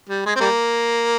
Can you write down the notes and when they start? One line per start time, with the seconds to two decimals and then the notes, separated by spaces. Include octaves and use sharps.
0.09 G3
0.26 G#3
0.36 C4
0.40 G3 A#3